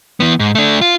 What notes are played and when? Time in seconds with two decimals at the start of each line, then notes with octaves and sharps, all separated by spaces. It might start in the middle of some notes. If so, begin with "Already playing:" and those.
0.20 E3 B3
0.40 G#2
0.55 A3 D4
0.81 F4